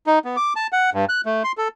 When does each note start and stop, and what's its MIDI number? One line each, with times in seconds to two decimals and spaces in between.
0.07 0.19 63
0.25 0.37 59
0.37 0.53 86
0.56 0.67 81
0.73 0.90 78
0.93 1.05 43
1.09 1.21 90
1.26 1.43 57
1.44 1.52 84
1.58 1.68 69